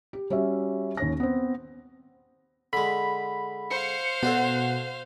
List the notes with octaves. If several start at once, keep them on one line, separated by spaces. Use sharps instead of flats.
G4
G3 C#4 F#4 E5
D#2 C#4 A#6
B3 C4
D3 G#3 B5
C5 F5 C#7
B2 D4 F#4 A4 F#5